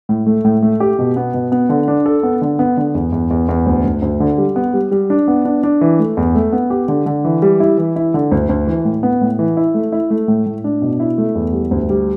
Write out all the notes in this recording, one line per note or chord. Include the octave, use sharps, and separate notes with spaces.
A2
A3
A2
A3
G4
B2
B3
B2
B3
D3
D4
A4
B3
D3
B3
D3
E2
E2
E2
E2
D2
D2
D2
D3
G3
B3
G3
G3
D4
B3
D4
D4
E3
A3
E2
A3
B3
G4
D3
D3
E3
G3
E4
E3
E4
D3
D2
D2
E3
A2
B3
A2
E3
E4
A3
E4
A3
A2
A2
D4
B2
E4
A3
E2
G3
D2
G3